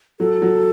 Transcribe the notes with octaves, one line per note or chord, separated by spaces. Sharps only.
F#3 A4
F#3